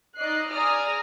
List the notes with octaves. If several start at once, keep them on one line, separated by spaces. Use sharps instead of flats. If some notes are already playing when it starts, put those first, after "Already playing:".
D#4 D5 D#5 F#6 C7
G#4 D5 G#5 A#5 D#6 F6